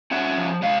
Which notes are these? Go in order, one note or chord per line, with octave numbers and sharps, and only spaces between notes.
C#4 E5 F#5
F3
G#3 D#5 F5